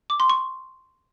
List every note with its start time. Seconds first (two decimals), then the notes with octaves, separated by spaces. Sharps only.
0.10 D6
0.20 C6
0.30 C#6